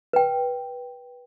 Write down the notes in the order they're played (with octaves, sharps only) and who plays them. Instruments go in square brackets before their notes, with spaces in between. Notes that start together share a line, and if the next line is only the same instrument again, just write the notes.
[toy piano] B4 G5